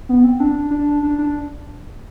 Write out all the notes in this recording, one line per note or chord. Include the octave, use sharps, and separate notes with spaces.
B3
C4
D4
D4
D4
D4